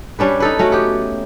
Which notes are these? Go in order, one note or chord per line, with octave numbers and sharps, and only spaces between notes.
G3 C#4 D4 B4
D#4 A4 B4
A3 C#4 F#4
B3 G4